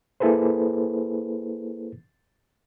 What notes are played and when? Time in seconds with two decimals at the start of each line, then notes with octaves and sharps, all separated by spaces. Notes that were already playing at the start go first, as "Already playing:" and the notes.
0.20 A#3 E4 G#4 A4 B4 C5